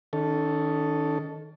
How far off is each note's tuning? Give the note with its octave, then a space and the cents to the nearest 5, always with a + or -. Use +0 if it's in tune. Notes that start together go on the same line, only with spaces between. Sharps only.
D#3 +0 C#4 +30 A4 +0